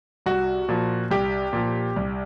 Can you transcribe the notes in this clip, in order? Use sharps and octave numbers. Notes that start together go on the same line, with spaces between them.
C2 F#4
A#2 F3
C2 G4
A#2 F3
C2